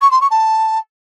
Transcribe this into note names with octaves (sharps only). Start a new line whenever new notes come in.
C#6
C6
C#6
A5